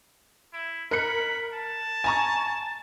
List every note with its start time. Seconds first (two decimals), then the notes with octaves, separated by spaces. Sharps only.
0.53 E4
0.91 A#4 B5 F#6 C#7
1.54 A5
2.04 G#5 A#5 C#6